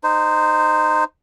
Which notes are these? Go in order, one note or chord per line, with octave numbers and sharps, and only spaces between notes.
D#4 C5